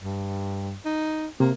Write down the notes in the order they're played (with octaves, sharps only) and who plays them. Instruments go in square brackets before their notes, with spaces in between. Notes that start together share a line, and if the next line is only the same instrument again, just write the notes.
[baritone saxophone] G2
D#4
[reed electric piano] C3 [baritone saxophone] A#3